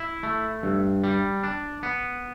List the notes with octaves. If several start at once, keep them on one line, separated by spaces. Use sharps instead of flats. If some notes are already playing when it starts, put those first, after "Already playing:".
Already playing: E4
A3
G2
G3
D4
B3